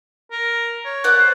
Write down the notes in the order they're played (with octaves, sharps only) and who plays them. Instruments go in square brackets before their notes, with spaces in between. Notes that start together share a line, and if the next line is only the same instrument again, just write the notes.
[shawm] A#4
C#5
[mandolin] B4 D5 F#5
[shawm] C5